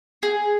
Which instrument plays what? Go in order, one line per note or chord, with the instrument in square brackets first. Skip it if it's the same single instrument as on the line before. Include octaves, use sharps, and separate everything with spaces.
[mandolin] G#4